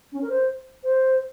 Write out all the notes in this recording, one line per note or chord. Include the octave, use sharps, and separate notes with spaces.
C#4
A#4
C5
C5